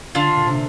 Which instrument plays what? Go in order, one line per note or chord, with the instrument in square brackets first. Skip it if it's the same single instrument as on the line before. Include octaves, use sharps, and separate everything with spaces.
[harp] D3 [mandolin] D4 F4
[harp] A#2
C3